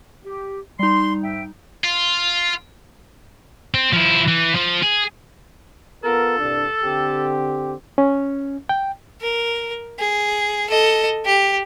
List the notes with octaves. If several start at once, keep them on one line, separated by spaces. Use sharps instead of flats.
G4
G3 D#4 C6
G#2 E5 G5
F4
C4
F3 E4
E3
F3
G#4
B3 F4 A4 A#4
C2 G2 D4
D3 C4 G4
C#4
G5
A#4
G#4
A4 D#5
G4